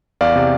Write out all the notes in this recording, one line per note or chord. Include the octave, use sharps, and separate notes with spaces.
E2 D5 F5
C3